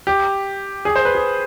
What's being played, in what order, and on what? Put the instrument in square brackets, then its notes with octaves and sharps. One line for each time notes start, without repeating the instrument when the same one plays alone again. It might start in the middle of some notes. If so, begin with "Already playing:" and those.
[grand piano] G4
G#4
C5
B4
G#4